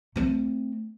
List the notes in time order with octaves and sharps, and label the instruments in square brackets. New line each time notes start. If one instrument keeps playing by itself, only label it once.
[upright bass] A3 C4